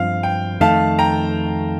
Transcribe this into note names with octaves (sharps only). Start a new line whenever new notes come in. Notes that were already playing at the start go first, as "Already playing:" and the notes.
Already playing: G2 F3 C4 F5
G5
F2 D#3 A3 F5 A5
G5 A#5